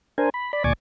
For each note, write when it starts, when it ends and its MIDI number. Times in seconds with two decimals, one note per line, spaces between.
0.18 0.30 62
0.18 0.30 70
0.18 0.30 72
0.18 0.30 80
0.34 0.52 83
0.53 0.64 74
0.53 0.64 83
0.64 0.73 38
0.64 0.73 46
0.64 0.73 74
0.64 0.73 80
0.64 0.73 85
0.64 0.73 86